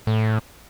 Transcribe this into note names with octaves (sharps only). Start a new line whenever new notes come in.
A2